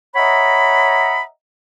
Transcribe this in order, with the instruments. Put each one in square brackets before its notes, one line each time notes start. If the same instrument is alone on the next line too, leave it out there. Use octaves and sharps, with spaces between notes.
[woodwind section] C#5 D#5 E5 F#5 A#5 B5